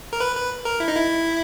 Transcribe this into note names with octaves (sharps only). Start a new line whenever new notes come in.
A#4
B4
B4
A#4
E4
D#4
E4